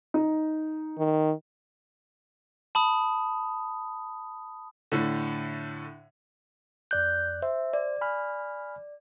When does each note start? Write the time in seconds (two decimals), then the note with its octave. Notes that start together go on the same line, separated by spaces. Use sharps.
0.14 D#4
0.98 D#3
2.75 A5 B5 D#6
4.92 A2 D3
6.91 F2 D5 F#6 G6
7.42 C5 E5
7.73 D5
8.01 G#5 B5 F6